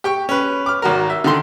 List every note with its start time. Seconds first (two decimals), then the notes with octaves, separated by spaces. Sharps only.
0.04 G4 G5 C#6
0.29 C#4 B4
0.66 D6 F6
0.82 G#1 F#4 A#4
1.10 E5
1.24 D3 D#3 C6